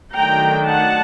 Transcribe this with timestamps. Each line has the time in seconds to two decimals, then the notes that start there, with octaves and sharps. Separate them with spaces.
0.14 D#3 F#3 A3 D4 G5 A#5
0.67 F#5 A5